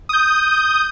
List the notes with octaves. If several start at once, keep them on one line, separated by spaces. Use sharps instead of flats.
D#6 G6